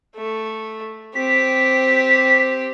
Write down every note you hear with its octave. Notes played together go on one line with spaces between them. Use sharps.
A3
C4 G4 B6